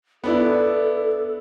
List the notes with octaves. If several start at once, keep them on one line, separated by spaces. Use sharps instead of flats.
B3 D4 E4 A4